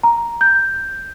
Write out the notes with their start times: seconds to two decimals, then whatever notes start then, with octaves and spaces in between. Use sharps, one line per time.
0.03 A#5
0.41 G6